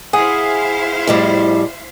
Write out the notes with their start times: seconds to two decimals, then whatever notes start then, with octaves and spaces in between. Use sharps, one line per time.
0.13 E4 G#4 C5 F5 F#5
1.07 F2 A2 G3